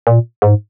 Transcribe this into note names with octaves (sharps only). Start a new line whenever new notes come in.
A#2
G#2